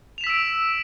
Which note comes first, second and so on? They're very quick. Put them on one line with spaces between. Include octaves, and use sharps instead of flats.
F7 E7 B6 E6 D7